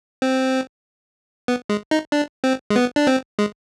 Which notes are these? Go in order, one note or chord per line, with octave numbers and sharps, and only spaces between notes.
C4
B3
G#3
D#4
D4
C4
G#3
B3
D4
C4
G#3